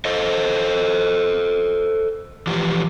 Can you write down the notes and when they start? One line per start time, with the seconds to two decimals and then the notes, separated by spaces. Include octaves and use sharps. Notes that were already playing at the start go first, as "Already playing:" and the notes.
0.05 A4 C5 D#5
2.47 E3 F3 G4